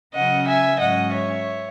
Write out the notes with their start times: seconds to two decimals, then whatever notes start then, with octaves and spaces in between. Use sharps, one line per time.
0.14 C#3 F#3 C#4 D#5 F#5
0.47 E5 G#5
0.79 G#2 F#3 C#4 D#5 F#5
1.11 C#5 E5